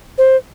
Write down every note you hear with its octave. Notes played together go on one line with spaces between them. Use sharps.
C5